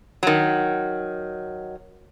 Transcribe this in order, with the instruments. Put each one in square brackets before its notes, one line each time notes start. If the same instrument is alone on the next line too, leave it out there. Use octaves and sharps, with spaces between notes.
[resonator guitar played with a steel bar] D#3 F#3